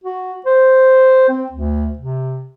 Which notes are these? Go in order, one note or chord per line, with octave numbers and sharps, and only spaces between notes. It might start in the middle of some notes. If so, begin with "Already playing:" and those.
F#4
C5
C4
D2
C3